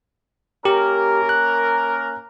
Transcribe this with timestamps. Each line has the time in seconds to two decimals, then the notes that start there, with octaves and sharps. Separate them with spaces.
0.65 A#3 C#4 G4 A#4
1.29 F#6